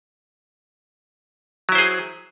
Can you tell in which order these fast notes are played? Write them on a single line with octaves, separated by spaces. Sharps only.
F#3 E4 C5 G#4